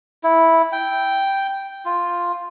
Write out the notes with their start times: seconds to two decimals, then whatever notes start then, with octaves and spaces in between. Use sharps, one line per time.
0.23 E4
0.72 G5
1.85 F4